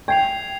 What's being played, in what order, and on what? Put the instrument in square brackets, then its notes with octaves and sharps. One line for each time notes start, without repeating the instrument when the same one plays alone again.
[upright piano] G5 [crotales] G#6 C7 F7